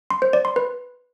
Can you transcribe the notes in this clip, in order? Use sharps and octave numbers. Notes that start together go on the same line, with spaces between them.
C6
C5
D5
C6
B4